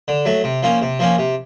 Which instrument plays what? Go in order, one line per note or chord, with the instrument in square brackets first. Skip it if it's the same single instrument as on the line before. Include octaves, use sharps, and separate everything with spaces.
[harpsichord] D3
F#3 A3
C3
F3 A#3 C#4
C3
F3 A#3 C#4
C3